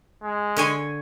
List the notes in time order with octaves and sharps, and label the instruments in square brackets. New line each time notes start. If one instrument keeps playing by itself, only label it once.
[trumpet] G#3
[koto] D3 C#5 G#5